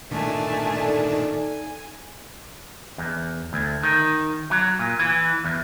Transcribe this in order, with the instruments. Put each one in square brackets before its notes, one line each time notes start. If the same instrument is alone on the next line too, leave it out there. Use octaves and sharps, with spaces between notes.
[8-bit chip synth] A#2 D#3 D4 [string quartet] A3 G#5 A5
[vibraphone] D#4 A4 D5
[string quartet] G#5
[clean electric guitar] E2
D2
D#3
F#3
A#2
E3
E2